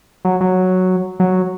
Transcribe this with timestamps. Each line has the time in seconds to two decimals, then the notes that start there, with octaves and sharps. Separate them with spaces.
0.25 F#3
0.41 F#3
1.20 F#3